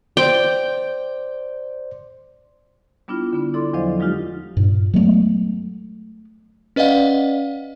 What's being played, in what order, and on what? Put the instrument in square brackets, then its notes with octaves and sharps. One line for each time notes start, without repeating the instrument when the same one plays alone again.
[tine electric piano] C5 D5 [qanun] G5
[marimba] G3 B3 D4 E4 F4
D3 B3 D4
E4 A4 D5 C6 D6
E2 F3 F#3 C5 D#5 F5
F#3 G#3 D#4 F4 G4
[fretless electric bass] G2 A#2
F#3 G#3 A3 B3
[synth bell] C#4 B4 D5 D#5 F5 F#5